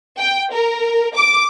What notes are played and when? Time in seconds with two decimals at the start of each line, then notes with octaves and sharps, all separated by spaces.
0.19 G5
0.52 A#4
1.15 D6